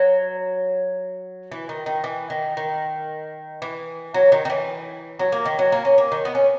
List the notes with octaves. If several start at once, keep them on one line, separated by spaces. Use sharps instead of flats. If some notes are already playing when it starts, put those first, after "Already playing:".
Already playing: F#3
E3
D#3
D#3
E3
D#3
D#3
E3
F#3
D#3
D#3
E3
F#3
A#3
D#3
F#3
A#3
C#4
A#3
D#3
B3
C#4